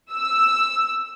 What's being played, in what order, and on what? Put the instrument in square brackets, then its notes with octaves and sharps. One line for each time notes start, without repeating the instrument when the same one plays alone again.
[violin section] E6